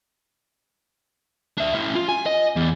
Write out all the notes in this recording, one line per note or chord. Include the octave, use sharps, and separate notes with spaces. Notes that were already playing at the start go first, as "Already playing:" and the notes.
D4 E5
C#4 E4
F4
G#5
D#5
E2